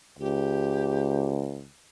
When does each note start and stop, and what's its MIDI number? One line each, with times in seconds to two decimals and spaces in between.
0.19 1.67 37
0.19 1.28 67